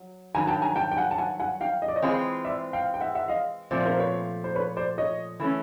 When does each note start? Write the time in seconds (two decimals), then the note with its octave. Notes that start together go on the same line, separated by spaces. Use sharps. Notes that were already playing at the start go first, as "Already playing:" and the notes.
Already playing: F#3
0.35 G2 D#3 F#3 G#5 A#5
0.47 G5 A5
0.62 G#5 A#5
0.76 G5 A5
0.92 G5
0.97 F#5 G#5
1.11 A5
1.18 F#5 G#5
1.39 F#5 G#5
1.61 F5 G5
1.82 D#5
1.88 D5
1.96 C#5 D#5
2.02 E3 G#3 C4 F4 G#4
2.45 D5 E5
2.73 F5 G5
2.94 G5
3.00 E5 F#5
3.15 E5 F#5
3.28 D#5 F5
3.71 A#2 F3 A3 C4 C5 D5
3.85 A#4 C5
3.99 B4 C#5
4.44 C5
4.55 B4 C#5
4.76 C5 D5
4.98 C#5 D#5
5.40 E3 A3 C#4